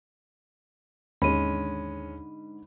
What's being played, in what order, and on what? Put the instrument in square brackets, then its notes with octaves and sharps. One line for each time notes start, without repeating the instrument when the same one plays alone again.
[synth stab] D#2 [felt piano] G#2 D3 [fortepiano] G#3 C#4 [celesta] B5 D#7